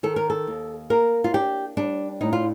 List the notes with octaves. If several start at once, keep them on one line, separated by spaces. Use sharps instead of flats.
D#3 A4
A#4
A4
D#2
A#3 A#4
F4
D4 G4
G3 D4
A2 D#4
F4